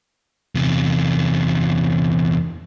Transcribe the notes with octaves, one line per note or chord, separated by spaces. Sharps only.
E2 C3